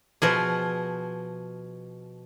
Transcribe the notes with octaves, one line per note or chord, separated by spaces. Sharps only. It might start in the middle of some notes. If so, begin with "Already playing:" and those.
B2 F3 G#4